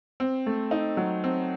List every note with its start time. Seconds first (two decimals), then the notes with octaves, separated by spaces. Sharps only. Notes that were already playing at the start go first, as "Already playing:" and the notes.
0.20 C4
0.46 A3
0.71 D#4
0.97 F#3
1.24 C4